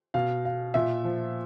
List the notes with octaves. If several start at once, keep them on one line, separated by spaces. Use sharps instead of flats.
B2 F5
F5
A#2 E5
F3